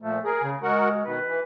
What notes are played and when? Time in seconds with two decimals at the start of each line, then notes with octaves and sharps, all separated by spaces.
0.02 A#2 F3 A3
0.24 G#4 A#4
0.43 C#3
0.63 G#3 F#4 A#4 F#5
1.05 B2 D#3 B4
1.27 E3